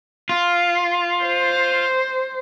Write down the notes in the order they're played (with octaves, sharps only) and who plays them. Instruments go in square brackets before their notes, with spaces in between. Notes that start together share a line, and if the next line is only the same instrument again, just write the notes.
[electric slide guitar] F4
[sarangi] C5